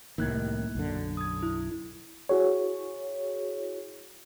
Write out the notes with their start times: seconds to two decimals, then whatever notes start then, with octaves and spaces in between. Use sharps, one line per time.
0.18 C2 A2 D#3 A#3 F#6 G#6
0.75 B1 F#2 D3
1.17 D#6 G#6
1.43 E4
2.29 E4 F#4 G#4 C#5